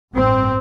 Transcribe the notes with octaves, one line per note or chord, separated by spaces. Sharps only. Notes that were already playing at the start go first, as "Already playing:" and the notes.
A1 G2 C4